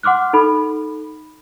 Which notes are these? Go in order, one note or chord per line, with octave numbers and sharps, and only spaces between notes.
F#5 C6 D6 F6 F#6
D#4 A4 B5